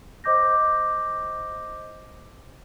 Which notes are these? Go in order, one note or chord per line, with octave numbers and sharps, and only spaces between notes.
C5 D#5 D6 G6 A#6